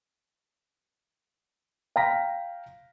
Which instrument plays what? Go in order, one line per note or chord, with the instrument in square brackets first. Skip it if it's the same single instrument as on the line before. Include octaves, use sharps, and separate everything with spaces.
[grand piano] F5 G5 A#5 A#6 B6